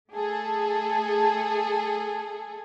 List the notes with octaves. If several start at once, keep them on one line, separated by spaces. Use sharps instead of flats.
A3 G#4 A4